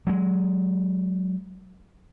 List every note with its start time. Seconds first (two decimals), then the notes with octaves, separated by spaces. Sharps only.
0.07 F#3 G#3